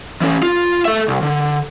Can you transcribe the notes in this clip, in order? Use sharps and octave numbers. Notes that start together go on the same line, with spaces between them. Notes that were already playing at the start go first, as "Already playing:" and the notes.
E3 C#4
F4
A4 E5
C2
D3